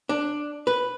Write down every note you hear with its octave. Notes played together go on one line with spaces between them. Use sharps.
D4
B4